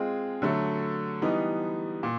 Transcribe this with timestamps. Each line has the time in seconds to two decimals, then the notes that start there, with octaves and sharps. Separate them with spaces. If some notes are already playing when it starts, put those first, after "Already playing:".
Already playing: G#3 C4 F4 G#4
0.42 D3 F#3 A3
1.22 E3 G3 B3 D#4
2.03 A#2